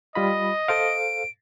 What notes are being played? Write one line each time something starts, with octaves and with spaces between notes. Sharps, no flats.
G3 F4 D#5 B5
A4 C5 F5 D7